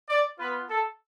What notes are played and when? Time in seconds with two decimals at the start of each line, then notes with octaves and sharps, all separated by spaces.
0.09 D5
0.39 B3 F4 B4
0.70 A4